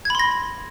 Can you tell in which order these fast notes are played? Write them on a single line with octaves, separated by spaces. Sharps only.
G#6 B5 C6 A#6